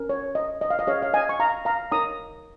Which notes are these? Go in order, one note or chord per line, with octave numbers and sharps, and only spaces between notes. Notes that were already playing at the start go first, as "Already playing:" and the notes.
Already playing: C#4 A#4
C#5
D#5
D#5
F5
D#5
C#4 G#4 C#5 F5
F5
D#5 G#5
C#6
F5 A#5
F5 A#5
D#4 A#4 C#5 A#5 D#6